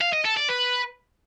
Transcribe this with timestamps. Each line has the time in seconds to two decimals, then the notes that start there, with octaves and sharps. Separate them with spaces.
0.01 F5
0.13 D#5
0.25 A4
0.37 D5
0.49 B4